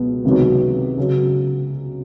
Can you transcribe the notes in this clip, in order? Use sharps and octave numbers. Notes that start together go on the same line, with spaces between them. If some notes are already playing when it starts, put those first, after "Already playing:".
Already playing: C#2 B2 F#3 B3
C#2 C3 D#3 F#3 B3
C#3 F#3